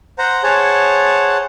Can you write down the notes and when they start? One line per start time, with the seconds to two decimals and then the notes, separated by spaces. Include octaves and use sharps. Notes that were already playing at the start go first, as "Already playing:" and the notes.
0.18 C5 F#5 A#5
0.43 G#4 C5 C#5 F#5 A5